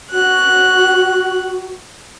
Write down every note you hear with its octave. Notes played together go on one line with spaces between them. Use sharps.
F#4 F#6